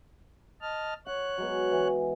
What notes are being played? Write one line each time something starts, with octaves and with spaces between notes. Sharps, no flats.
D#5 A5 F6
C#5 F#5 F#6
F#3 G#3 B3
E3